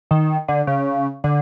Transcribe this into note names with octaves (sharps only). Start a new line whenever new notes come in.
D#3
D3
C#3
D3